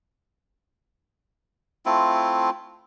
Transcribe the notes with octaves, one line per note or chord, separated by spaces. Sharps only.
A3 C4 E4 F4